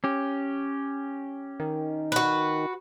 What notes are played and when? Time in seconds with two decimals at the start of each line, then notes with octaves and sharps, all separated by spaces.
0.04 C#4 G4
1.60 D#3
2.12 F#4 B4